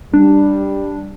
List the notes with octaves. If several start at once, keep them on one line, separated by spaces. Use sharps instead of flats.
G3 D4